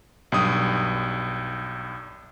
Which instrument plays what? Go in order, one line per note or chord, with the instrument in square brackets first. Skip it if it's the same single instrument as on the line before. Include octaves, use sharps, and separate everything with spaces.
[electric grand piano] B1 G2 D#6